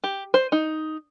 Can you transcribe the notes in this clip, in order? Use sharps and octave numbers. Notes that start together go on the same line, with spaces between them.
G4
C5
D#4